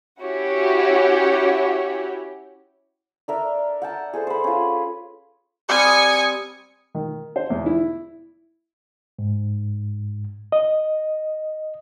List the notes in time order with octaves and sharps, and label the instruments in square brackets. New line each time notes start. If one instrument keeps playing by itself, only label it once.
[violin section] C#4 E4 F#4 G4 C#5
[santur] D4 A#4 E5
F#5 G5 A5
G#4 A4 C5
B4 C5
C#4 F4
[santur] G3 C4 [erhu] G#5 [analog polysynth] D#6 C#7
[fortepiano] D#3
C5
E2
E4
[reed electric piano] G#2
D#5